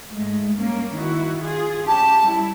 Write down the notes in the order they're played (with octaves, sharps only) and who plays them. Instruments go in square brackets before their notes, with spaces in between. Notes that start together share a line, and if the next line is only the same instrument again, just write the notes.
[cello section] G#2 G#3 A3
G2 A#3 C#4
D#3 E4 F#4
F4 G#4
[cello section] C#4 G4 [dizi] A5
[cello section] G3 E4